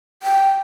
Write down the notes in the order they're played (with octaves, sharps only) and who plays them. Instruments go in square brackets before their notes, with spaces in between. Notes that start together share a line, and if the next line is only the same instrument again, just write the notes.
[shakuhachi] G5